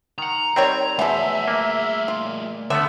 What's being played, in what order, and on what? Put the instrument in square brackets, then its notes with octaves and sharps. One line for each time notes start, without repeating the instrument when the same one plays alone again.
[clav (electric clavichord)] D#3 F#5 [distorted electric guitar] A#5
[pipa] D#3 G3 C#5 [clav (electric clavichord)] C4
[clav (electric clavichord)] E2 [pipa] F3 F#3 [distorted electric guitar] A3 G#4 [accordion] E5
[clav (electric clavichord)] A#3
[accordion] A#2 [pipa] F4
[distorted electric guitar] D2 [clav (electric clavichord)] D3 A3 B3 [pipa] E5